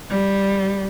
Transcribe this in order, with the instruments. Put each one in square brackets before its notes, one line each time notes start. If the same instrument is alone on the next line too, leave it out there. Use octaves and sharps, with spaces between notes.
[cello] G3